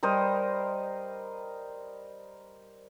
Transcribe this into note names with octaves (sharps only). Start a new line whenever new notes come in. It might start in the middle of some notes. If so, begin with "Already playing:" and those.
G3 A#4 C5 D#5